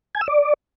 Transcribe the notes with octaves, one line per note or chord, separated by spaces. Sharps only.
G#5
E6
D5